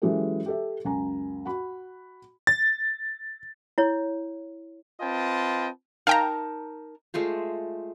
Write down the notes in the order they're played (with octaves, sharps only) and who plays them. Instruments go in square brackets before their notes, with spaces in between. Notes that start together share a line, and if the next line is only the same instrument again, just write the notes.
[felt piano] E3 F#3 G#3 C#4 G4 A4
G4 A4 E5
C#2 F#2 G#5 A#5
F#4 B5
[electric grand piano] A6
[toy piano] E4 C#5
[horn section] C4 F4 B4 D#5 G5 A5
[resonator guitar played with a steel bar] D#4 A#4 A5 [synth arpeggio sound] F5 G5 A#5
[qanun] G#3 A3 F4 C5